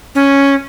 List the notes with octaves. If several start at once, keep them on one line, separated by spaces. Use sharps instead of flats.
C#4